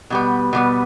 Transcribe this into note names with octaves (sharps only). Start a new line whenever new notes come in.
B2 G3 B3
B2 G3 B3